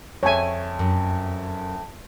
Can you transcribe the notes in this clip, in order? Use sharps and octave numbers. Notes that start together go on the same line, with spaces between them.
F2 C#5 E5 G#5
F#2